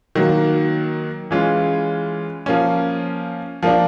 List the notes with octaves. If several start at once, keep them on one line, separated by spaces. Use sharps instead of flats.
D#3 F#3 A#3
E3 G#3 C#4 F4
F3 A#3 C#4
F3 A#3 D4